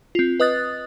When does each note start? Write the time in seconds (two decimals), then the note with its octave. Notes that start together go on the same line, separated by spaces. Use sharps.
0.15 C4 F4
0.40 B4 D#5 D#6 F#6 A6